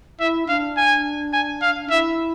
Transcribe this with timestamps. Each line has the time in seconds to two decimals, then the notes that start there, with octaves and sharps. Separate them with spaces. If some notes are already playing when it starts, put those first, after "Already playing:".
0.20 E4 E5
0.48 D4 F5
0.77 G#5
1.33 G#5
1.62 F5
1.90 E4 E5